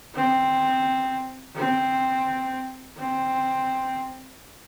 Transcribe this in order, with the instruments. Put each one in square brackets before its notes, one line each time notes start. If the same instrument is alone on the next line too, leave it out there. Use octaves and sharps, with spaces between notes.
[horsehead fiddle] C4
C4
C4